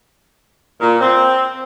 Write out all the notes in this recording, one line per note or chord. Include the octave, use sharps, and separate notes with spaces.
A#2
C4